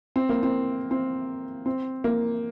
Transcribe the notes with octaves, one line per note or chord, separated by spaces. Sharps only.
C4
A#3
C4
C4
C4
A#3